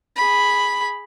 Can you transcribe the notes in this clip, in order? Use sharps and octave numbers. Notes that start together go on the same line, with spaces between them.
G#4 B5